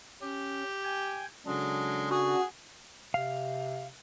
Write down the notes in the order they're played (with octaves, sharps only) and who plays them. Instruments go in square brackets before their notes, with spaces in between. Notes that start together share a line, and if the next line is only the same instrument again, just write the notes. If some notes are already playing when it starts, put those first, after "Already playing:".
[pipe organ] C#4 [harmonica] G4
[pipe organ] G5 G#5
[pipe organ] C#3 D4 A4 [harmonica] F#3 G#3
[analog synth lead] F#4 [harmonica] G#4
[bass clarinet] C3 [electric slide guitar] F5